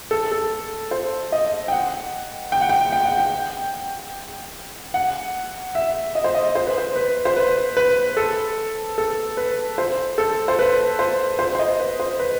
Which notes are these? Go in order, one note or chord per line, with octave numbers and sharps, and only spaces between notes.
A4
A4
C5
D#5
G5
F#5
G5
F#5
G5
G5
F#5
G5
F#5
E5
D#5
C5
D#5
C5
B4
C5
B4
C5
B4
B4
A4
A4
B4
C5
A4
C5
B4
C5
C5
C5
D#5
B4
C5
B4